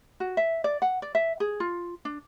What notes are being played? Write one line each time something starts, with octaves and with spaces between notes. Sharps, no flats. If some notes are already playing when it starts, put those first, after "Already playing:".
F#4
E5
D5
F#5
D5
E5
G#4
F4
D4